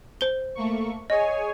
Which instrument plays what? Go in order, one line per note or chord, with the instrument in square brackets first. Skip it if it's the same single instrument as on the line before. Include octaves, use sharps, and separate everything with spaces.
[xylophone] C5 G7
[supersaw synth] A3 A#3 C#6
[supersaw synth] G#4 C#5 G#5 [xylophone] D#5